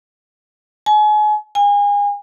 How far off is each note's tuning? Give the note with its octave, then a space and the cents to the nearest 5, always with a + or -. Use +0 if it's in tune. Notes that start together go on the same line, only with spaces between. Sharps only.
G#5 +35
G#5 -30